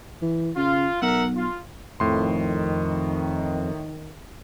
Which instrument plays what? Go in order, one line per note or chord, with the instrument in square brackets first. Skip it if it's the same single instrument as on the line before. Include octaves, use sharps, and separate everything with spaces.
[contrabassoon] E3
[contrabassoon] C#3 [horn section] F4
[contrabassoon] B1 [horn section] A#4 E5 F#5
[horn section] F4
[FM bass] F2 [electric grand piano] A2 C6 [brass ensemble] D#3